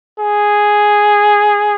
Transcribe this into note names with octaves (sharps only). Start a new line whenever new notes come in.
G#4